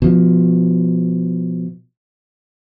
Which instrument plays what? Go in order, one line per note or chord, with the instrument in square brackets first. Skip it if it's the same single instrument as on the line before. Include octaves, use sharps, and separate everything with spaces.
[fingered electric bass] B2 F3